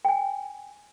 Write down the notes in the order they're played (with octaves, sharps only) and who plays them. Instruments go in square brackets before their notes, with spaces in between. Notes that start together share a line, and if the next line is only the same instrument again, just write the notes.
[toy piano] G5 G#5